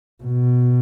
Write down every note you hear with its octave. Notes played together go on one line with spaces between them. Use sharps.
B2